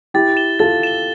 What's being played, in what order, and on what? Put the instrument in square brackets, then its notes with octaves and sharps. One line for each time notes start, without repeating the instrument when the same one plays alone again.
[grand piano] E4 G4 [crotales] A6
[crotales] E7 G7
[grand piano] F4 A4 [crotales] A6
[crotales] E7 G7